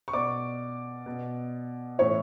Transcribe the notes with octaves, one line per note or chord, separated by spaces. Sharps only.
C#6
B2 D5 D6
B2
A2 E3 C#5 C#6